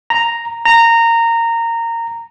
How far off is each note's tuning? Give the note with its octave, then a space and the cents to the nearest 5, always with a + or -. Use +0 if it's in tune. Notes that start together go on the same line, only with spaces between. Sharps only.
A#5 +0
A#5 -15